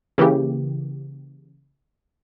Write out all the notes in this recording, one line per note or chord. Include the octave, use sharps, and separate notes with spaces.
C#3 E3 A#3 G4